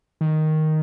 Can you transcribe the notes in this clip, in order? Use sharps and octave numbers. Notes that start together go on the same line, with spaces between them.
D#3